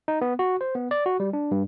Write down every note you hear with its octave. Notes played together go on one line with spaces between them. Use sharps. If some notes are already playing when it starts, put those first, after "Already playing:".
D#4
B3
F#4
C5
B3
D5
F#4
G3
D4
G2